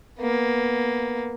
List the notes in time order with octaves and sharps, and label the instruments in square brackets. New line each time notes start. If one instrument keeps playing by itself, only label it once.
[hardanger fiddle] A#3 B3